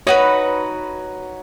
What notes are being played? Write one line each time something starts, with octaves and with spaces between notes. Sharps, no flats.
D#4 F#4 B4 C#5